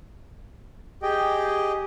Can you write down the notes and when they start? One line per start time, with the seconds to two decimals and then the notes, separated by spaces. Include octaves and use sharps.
1.02 G4 G#4 D#5 G5